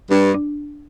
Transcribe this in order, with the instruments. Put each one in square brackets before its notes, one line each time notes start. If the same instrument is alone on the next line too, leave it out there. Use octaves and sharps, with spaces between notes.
[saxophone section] G2 [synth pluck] D4
[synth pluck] D4